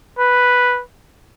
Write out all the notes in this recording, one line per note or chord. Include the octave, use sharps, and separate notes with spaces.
B4